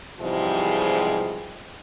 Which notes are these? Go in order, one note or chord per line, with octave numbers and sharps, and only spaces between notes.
G#2 C3 E3 F3 G3 G#3